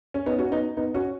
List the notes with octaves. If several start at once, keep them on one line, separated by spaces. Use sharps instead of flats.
C#4
B3 D#4
C#4 F#4
B3 D#4
B3 D#4
C#4 F#4